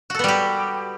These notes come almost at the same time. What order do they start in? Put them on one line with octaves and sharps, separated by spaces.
F#4 A4 B3 G3 G4